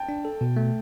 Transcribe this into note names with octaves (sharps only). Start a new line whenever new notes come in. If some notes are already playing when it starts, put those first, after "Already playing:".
Already playing: G5 A5
D4
A4
B2
A3